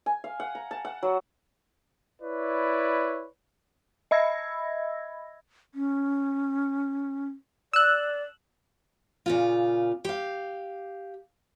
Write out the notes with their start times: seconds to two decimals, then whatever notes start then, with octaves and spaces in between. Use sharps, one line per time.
0.06 G#5
0.24 F5
0.40 F#5
0.55 A#5
0.71 A5
0.85 F#5
1.03 F#3
2.22 E4 B4 C#5 D5
4.11 D#5 E5 B5 E6 G#6 A#6
5.75 C#4
7.73 D5 E6 F#6
9.26 A#2 C#3 F4
10.05 G4 F5